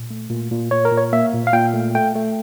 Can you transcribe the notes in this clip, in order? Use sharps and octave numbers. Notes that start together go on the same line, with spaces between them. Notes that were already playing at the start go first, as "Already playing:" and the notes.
Already playing: A#2
A3
A#2
A#2
A#2 C#5
A#4
A#2
C#5
A#3 E5
A#2
F5
A#2 G5
A3
A3 G5
A3